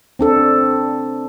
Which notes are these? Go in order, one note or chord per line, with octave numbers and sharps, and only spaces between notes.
C4 D4 A4